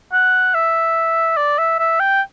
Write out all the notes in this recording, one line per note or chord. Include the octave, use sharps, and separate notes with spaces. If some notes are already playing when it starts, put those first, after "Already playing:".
F#5
E5
D5
E5
E5
G5